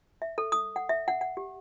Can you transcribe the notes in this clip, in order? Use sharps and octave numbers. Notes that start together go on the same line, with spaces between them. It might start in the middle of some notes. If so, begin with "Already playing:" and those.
E5
A4
D#6
F#5
E5
F#5
F#5
G4